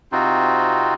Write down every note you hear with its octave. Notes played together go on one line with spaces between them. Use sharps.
C3 C4 D#4 F4 F#4